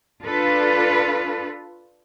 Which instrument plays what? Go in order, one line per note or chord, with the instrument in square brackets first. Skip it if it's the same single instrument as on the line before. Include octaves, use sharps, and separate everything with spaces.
[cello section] D4 F4 A4 B4